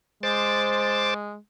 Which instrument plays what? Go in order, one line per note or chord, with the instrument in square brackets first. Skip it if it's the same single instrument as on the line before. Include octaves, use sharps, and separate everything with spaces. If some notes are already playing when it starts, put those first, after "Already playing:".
[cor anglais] G#3 [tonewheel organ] C5 D6 A6